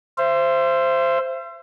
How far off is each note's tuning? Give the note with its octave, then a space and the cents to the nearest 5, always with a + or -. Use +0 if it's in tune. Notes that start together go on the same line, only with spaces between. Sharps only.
C5 +0 E5 +40